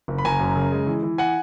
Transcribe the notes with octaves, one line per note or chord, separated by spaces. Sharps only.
F#1
B5
F#1 G#5 A#5
F#2
C#3
G#3
E3
E3
F#5 G#5